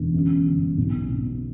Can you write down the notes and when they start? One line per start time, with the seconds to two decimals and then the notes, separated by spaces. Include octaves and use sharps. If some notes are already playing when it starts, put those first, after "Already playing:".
Already playing: E1 D3
0.14 F#2
0.46 G1
0.78 B1
1.09 B2